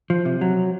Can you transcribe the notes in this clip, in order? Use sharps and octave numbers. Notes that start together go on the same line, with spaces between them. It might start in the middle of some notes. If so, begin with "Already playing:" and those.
F3
C3
F#3